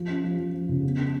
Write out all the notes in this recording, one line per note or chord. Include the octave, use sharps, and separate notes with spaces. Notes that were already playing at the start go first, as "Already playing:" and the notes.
Already playing: F3
C#4
F3
F3
F3
C#3
B3
D4